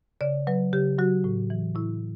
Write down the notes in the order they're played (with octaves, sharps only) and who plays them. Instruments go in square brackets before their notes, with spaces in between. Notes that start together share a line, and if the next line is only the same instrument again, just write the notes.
[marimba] C#3 D5
F#3 B4
C#3 G4
F#3 F#4
A2
E3
A2 E4